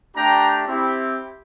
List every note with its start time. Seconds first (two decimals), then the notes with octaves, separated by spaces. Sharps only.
0.15 A3 D4 G4 G5 A#5
0.67 C4 E4 G4